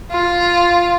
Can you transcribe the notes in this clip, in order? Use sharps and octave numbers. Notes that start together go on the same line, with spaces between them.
F4